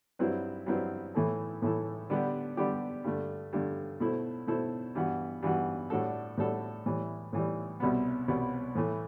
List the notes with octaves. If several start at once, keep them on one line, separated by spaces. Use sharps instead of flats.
G2 F#3 C4 E4 B4
G2 F#3 C4 E4 B4
A2 E3 A3 E4 A4
A2 E3 A3 E4 A4
D3 G3 B3 D4 G4
D3 G3 B3 D4 G4
G2 D3 A3
G2 D3 A3
B2 A3 E4 A4 C5
B2 A3 E4 A4 C5
G2 E3 B3 F#4
G2 E3 B3 F#4
A2 G3 D4 F#4 A4
A2 G3 D4 F#4 A4
A2 E3 G3
A2 E3 G3
C2 B2 G3 B3
C2 B2 G3 B3
A2 E3 A3